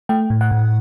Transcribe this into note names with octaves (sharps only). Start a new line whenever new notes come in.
A3 G5
A2
F#5
A2